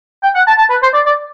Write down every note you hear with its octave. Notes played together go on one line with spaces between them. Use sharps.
G5
F#5
A5
A5
B4
C5
D5
D5